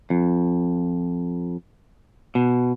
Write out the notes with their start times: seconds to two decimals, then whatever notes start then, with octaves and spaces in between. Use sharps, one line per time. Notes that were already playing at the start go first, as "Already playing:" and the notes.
0.10 F2
2.35 B2